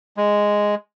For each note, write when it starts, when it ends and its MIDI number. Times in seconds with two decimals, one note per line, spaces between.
0.17 0.75 56